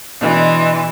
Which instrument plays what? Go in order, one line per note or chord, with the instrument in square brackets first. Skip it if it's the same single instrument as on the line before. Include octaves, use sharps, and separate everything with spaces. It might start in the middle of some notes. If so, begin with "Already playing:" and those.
[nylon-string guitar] B2 G#3 D4 [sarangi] E3 [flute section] D#5 C6